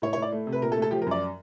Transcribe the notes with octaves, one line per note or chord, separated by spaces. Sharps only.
A2 C#5
C#5
A2
D5
A3
C3
B4
A#2 A#4
A4
A3
A4
F3 G4
A#4
F#2 D5